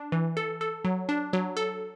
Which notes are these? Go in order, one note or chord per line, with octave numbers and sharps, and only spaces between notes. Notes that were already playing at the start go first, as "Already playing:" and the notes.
Already playing: D4
E3
A4
A4
F#3
D4
F#3
A4